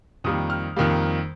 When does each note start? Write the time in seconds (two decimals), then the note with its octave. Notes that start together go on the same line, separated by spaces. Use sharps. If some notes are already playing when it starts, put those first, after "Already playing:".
0.24 F2 D#3 G3 A#3 D#6
0.50 F6
0.76 F2 D#3 G3 A#3